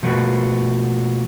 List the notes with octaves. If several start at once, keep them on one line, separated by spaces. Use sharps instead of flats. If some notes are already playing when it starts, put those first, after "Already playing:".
B2 F3 A3 A#3 F#4 B4